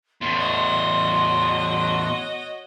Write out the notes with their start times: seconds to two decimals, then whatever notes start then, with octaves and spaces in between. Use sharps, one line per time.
0.21 E2 A2 C6
0.39 F#4 C#5 D#5